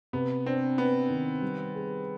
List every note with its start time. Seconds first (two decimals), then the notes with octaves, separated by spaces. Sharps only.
0.13 C3 B3
0.46 C4 D4
0.78 B3 D4
1.10 D#3
1.42 G3
1.75 G#4